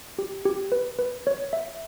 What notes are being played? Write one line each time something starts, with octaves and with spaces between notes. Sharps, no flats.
G4
G4
B4
B4
C#5
E5